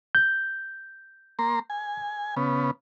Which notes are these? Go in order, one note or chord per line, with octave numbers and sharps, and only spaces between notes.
G6
A#3 A#5 C6
G#5
C#3 B3